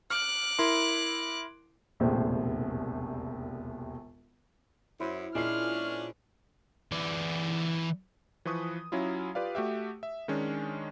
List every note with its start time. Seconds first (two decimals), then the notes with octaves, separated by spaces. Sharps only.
0.10 D6 F6 F#6
0.59 E4 A#4 C6
2.00 E1 A#1 D#2 C3 A3 C5
5.00 F#2 E4 C5
5.35 A#2 G#3 C#4 D4 E4 F6 C7
6.92 E3 D5
8.45 E3 F3 B4 C#6 D#6
8.92 F#3 C#4 E4 F4
9.35 F4 G4 B4 D5 F5
9.55 A3 F#4 G4 E5
10.03 E5
10.28 D#3 G#3 C#4 D4